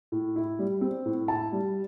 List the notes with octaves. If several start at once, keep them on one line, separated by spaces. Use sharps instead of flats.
A2
E4
G3
C4
A2
E4 A5
G3